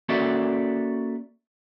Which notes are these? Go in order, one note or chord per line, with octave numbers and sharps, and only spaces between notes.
A#3 C#4 F#4 A4 D5 E5